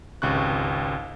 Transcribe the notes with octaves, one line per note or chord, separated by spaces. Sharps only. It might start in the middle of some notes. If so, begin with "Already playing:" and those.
G#1 C#2 C3 C#6 F#6